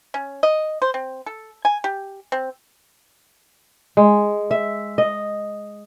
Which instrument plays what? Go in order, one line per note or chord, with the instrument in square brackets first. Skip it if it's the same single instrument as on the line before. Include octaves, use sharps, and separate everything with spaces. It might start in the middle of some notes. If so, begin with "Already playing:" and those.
[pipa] C#4
D#5
C5
C4
A4
G#5
G4
C4
[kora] G#3
E5
D#5